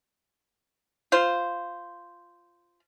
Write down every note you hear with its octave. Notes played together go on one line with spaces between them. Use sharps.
F4 C5